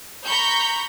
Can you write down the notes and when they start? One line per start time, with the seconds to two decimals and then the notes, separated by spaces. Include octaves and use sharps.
0.24 A#5 B5 C#6 G6